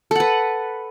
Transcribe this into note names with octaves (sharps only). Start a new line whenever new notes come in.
A4 B4 F#5